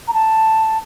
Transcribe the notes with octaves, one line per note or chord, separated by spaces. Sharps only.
A#5
A5